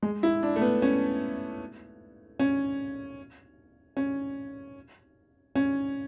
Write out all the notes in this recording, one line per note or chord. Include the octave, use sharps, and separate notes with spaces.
G#3
E4
D4
A3
B3
C#4
C#4
C#4
C#4